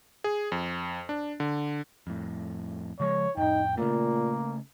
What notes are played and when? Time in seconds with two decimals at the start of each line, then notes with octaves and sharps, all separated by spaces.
0.24 G#4
0.52 F2
1.09 D4
1.40 D3
2.07 F2 A2
3.00 C#3 F3 G#3 C#5
3.37 F2 A2 D#4 G5
3.77 A#2 C#3 A3 A#3